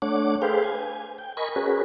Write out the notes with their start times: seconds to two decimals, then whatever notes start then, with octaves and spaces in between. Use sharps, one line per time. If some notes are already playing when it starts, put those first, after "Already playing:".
0.02 A3 D4 C#5 F#5 D6
0.42 G#4 A4 B4 C5 F5 G5
0.64 G#5
1.18 G5
1.37 A#4 D#5 G#5 B5 C#6
1.56 C#4 F#4 G#4 A#4 B4